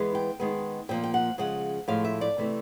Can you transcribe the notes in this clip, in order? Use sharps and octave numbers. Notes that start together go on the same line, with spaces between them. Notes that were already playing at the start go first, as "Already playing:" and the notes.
Already playing: E3 G#3 B3
G5
D#3 G#3 B3
A#2 F3 A#3 G5
G5
F#5
C#3 F3 G#3 F#5
A2 F3 G#3 F5
E5
D5
C3 E3 A3 C4